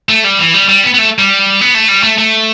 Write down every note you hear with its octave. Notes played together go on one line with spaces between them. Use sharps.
A3
G3
E3
G3
G3
B3
B3
A3
G3
B3
A3
G3
A3
A3